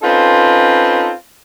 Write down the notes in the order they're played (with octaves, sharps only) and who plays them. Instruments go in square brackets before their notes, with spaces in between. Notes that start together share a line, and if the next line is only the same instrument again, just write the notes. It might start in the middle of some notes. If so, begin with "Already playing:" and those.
[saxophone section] C4 C#4 D#4 F4 A4 B4